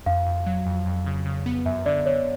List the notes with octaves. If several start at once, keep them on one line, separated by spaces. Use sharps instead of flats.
F2 F5
F2
F#3
F2
F2
C#3
C#3
B3
F#2 E5
D3 D5
D3 C#5